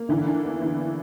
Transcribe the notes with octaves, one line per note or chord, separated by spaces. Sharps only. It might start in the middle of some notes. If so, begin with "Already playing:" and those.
Already playing: A#3
D3 E3
D4
E2
E3